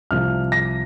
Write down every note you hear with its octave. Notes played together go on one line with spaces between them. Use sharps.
C2 C3 F3 F6
A#6